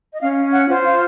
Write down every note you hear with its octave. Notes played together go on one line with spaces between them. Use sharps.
D#5
C#4 F5
F#5
F4 C5
F5